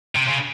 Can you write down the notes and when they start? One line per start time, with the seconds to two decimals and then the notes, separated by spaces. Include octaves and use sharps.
0.15 C3
0.28 C#3